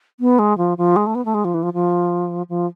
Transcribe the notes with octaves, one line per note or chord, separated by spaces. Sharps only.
B3
G#3
F3
F3
G#3
A3
B3
A3
G#3
F3
E3
F3
F3
F3